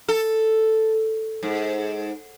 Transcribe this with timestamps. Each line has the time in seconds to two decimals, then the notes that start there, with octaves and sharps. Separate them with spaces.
0.09 A4
1.43 G#2